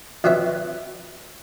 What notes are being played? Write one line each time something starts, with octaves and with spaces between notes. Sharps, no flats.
A#1 B2 C4 C#5 E5